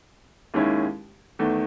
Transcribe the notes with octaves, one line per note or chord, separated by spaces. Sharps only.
D#2 D#3 G#3 C#4 E4
E2 D#3 A3